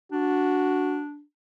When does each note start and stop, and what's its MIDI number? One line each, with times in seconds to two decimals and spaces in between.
0.12 1.22 62
0.12 1.02 66